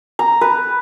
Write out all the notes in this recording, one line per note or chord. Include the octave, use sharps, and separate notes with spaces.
A#5
B4